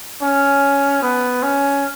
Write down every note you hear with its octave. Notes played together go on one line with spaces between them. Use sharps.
C#4
B3
C#4